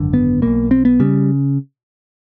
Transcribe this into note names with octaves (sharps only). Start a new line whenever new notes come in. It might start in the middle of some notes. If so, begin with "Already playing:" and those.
Already playing: G#1 F#2 D3
B3
B1 B2 A#3
C4
B3
C#3 G3